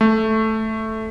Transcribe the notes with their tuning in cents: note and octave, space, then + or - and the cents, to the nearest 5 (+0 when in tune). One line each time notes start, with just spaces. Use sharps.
A3 -5